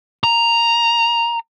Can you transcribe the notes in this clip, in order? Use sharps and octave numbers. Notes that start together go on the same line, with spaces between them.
A#5